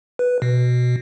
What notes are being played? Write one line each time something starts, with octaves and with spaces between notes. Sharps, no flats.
B4
B2